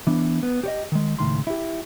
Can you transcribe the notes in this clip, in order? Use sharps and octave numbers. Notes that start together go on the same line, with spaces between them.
E3 B3 D4
B3
G4 C#5 D#5
D#3 G#3
C#2 A2 D#3 C6
E4 G4